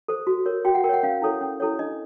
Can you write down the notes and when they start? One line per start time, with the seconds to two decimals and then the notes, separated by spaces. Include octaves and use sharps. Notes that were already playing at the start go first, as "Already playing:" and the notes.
0.08 A4 C5
0.27 F#4
0.46 A#4 C#5
0.65 F#4 G5
0.75 F#5
0.84 A#4 G5
0.89 C#5 F#5
1.03 C#4 F5
1.22 E4 A4 C#5
1.41 C#4
1.60 E4 A4 C#5
1.79 D4 D#5